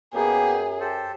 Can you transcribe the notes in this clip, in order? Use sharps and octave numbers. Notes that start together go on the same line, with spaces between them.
F#2 A#3 B3 G4 G#4
G4 A4 C5